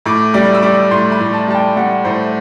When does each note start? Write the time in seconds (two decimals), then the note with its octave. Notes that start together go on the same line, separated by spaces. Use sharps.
0.06 A2 D6
0.34 G3 D6
0.54 E6
0.62 G3 D6
0.91 A2 C6
1.12 B5
1.20 A2
1.33 A5
1.47 G3 A5
1.55 G5
1.76 G3 F#5
2.05 A2 C5